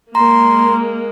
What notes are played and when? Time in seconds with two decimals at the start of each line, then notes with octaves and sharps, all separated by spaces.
0.15 G#3 A#3 A#5 C6